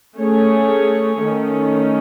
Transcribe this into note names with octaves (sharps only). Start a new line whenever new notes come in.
A3 C#4 G#4 C#5
D#3 A3 C#4